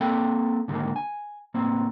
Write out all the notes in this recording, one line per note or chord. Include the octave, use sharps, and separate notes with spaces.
A#3 C4 A4 G5
G#2 D3 D#3 F#3 G#3 A#3
G#5
A2 A#3 C4